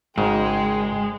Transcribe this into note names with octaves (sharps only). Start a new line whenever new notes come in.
G#1 G#2 C#3 G#3 G5